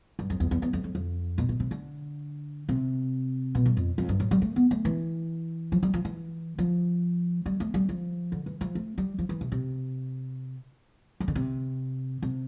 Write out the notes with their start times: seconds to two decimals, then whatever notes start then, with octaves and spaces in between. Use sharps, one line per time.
0.19 G2
0.30 F2
0.40 E2
0.51 E2
0.62 E2
0.73 F2
0.84 F2
0.95 F2
1.38 B2
1.49 B2
1.60 C3
1.71 D3
2.69 C3
3.55 B2
3.66 G2
3.77 F2
3.98 F2
4.09 G2
4.20 A2
4.31 G3
4.42 A3
4.56 B3
4.71 A3
4.85 E3
5.72 F3
5.83 G3
5.94 F3
6.05 E3
6.59 F3
7.46 G3
7.60 A3
7.74 G3
7.89 F3
8.32 D3
8.46 E3
8.61 F3
8.75 A3
8.98 G3
9.19 F3
9.29 E3
9.41 C3
9.52 C3
11.20 E3
11.28 D3
11.35 C3
12.22 C3